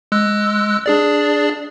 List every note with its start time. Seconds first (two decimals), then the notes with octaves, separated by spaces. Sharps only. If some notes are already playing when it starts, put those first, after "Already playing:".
0.12 G#3 E6 F#6
0.86 D4 G#4 D5